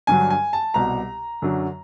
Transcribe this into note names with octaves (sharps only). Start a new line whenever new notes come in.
G2 D3 F#3 G#5
G#5
A5
C2 B2 G3 A#5
F#2 D3 F#3